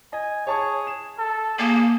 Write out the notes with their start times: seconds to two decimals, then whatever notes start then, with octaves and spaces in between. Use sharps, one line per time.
0.13 D#5 G#5
0.47 G#4 C#5 A5 C#6
0.87 E7
1.18 A4
1.59 A#3 G#4